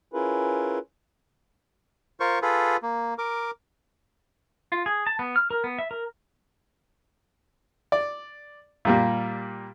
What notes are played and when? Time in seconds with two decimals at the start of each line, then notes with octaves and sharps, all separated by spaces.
0.14 C#4 E4 F4 G#4 A#4 B4
2.20 F4 A#4 C5 C#6
2.42 F4 G#4 A4 B4
2.83 A#3
3.18 A#4 D6
4.72 F4
4.86 G#4
5.07 A5
5.19 B3
5.36 F6
5.51 A#4
5.64 B3
5.79 E5
5.91 A#4
7.92 D5
8.85 A#2 G3 A#3